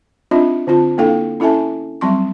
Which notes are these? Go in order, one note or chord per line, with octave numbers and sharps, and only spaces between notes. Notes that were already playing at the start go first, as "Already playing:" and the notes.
C4 D4 D#4 F4 D#5 E5
D3 C4 F4 A5
A#3 D4 E4 A4 F5 G5
C#4 E4 A4 E5 G#5 A5
F#3 G3 C4 C6 C#6